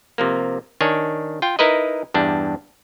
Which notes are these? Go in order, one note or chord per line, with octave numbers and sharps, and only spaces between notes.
C3 F3 A#3
D#3 D4 C#5 G#5
F4 G5
D#4 E4 A#4 B4 D#5
E2 G2 D4